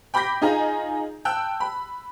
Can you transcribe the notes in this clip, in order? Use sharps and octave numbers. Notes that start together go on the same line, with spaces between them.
G5 B5 D6 G6 A#6 B6
D#4 F4 G#4 D#5 G#5 A#5
G5 A5 E6 F#6
B5